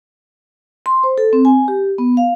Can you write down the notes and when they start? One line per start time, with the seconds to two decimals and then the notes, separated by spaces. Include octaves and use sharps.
0.86 C6
1.04 C5
1.18 A4
1.33 C4
1.45 G#5
1.68 G4
1.98 B3
2.17 F5